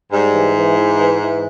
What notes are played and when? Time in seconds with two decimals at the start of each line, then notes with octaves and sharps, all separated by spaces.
0.12 G#2 G3
0.33 E3
0.56 E3
0.77 E3
0.99 E3
1.20 E3